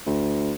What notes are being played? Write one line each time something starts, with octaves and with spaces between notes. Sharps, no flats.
D2